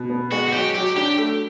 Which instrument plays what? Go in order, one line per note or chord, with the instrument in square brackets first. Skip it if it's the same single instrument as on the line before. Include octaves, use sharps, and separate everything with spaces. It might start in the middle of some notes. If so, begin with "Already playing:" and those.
Already playing: [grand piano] B2
B3
[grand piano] G#3 [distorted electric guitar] F#4
[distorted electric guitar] F#4
[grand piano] F#3 [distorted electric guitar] G4
[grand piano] F#3 [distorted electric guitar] G4
[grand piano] D4 [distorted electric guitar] G4
[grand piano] A3